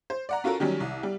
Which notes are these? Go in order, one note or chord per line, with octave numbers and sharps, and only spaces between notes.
C5
D5 F#5 A#5
C#4 F4 F#4 A4 A#4
D#3 F#3 G3 C#4
C2
G3